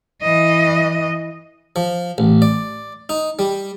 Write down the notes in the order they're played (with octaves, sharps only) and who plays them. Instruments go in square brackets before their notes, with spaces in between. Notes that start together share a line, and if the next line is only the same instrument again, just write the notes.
[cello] E3 D#5
[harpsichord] F3
A1
D5
D#4
G3